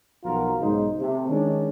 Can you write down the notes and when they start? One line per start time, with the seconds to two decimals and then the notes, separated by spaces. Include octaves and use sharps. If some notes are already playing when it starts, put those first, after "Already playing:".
0.24 B1 F3 F4 F#4 A#4
0.61 B1 G#2 C#3 G#3 D#4 C5
0.99 C3 A3
1.29 D#3 G#3 C#4 D4